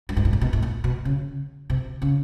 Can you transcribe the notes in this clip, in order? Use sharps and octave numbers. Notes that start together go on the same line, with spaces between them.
G2
G#2
A2
A#2
B2
A2
A#2
B2
C#3
C3
C#3